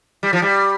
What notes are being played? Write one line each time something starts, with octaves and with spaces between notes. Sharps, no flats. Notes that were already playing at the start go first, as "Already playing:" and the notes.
G3
F3
G3